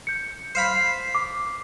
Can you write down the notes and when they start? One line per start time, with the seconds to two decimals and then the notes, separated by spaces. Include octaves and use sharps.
0.07 G6 C#7
0.55 C5 F5 B5
1.15 D6